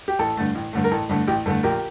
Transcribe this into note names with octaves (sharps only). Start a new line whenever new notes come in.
G4
A1 A4
G2 D3 A3
A1
G2 D3 A3
A#4
A1 A4
G2 D3 A3
A1 G4
G2 D3 A3 A4
A#1 G4 A#4